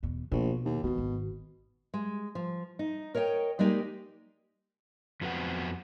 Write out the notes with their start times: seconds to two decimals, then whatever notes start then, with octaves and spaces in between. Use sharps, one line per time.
0.03 E2 B2
0.32 A#1 B2
0.65 D#2
0.83 B2 E3 G#3
0.98 G#1
1.94 G#3
2.35 F3
2.79 D#4
3.15 A#4 C#5 D#5 F5 G5
3.59 G3 G#3 A#3 D#4 G4 G#4
5.21 F2 F#3 B3 C4 B4 F#5